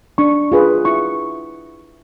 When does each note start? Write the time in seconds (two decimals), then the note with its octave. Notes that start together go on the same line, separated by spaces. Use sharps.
0.18 D4 C#6
0.52 F4 G#4 B4
0.85 E4 C#6